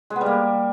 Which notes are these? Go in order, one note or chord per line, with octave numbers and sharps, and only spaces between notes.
G#3
B3
G3
A#3